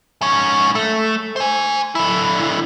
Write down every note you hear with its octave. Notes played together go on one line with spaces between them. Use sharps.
G#2 C#5
A3
C5 G#5
D3 E4